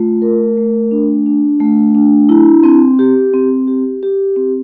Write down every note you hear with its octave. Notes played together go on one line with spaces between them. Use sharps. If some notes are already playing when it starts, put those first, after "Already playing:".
Already playing: A3 F4
A#4
A3
D4
D4
A3
D4
E4
C4
G4
C4
G4
G4
C4